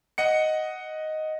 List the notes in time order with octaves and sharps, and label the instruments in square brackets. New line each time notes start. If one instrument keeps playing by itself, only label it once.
[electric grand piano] D#5 F#5 C#7